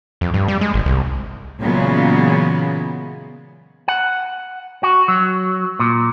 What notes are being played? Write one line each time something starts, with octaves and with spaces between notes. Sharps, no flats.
F2
G2
G3
G#3
G#1
C2
A#2 C#3 E3 F#3 G#3 B3
F#5
F#4
F#3
A#2